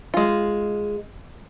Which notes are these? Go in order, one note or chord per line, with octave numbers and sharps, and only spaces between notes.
G#3 F4